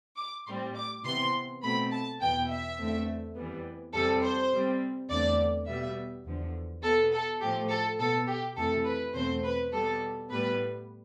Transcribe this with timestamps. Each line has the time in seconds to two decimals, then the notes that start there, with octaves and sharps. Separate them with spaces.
0.18 D6
0.47 A2 G3 C4 C6
0.75 D6
1.05 C3 E3 B3 C6
1.63 B2 A3 C4 B5
1.92 A5
2.21 E2 B2 B3 G5
2.49 E5
2.79 E2 D3 A3 C4
3.36 F2 E3 G3 B3
3.94 F2 C3 E3 G3 A4
4.23 C5
4.52 C3 G3 C4
5.10 E2 D3 A3 C4 D5
5.67 B2 G3 B3 E5
6.26 E2 D3 F3
6.83 B2 B3 A4
7.12 A4
7.41 A2 F3 A3 G4
7.70 A4
7.99 B2 B3 A4
8.28 G4
8.57 F2 C3 E3 A3 A4
8.86 B4
9.15 E2 B2 A3 C4 C5
9.44 B4
9.72 B2 G3 B3 A4
10.30 A2 G3 B3 B4